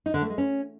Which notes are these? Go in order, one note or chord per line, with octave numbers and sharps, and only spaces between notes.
D#4
D3
A3
G#3
C#4